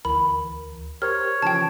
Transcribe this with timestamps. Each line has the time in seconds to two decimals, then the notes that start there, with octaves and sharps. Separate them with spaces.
0.05 D2 E3 A#4 B5
1.02 G4 A#4 C5 C#5 F6
1.42 C#3 E3 F3 G5 A5